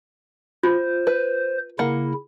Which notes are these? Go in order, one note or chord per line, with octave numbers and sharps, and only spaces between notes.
F4 C5
B4
C#3 A#3 E4 F#5